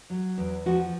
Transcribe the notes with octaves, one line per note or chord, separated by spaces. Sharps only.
F#3
E2
F3 F#4